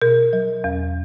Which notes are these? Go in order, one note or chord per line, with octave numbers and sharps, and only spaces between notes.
B2 A#4
F#3
E2